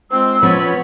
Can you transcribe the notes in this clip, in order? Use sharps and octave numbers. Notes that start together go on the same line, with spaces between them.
G#3 C4 F4 C5 E6
F3 B3 C#4 C#5 B5